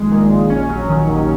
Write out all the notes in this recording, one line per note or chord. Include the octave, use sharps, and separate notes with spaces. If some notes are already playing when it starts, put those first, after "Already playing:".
Already playing: A#1 D#3 G#3
A#2
A#1
C#4
F#3
D#3
D#2